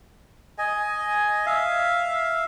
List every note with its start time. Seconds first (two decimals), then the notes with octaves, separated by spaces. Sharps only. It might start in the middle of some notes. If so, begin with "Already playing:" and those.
0.58 D#5 G#5
1.46 E5 F5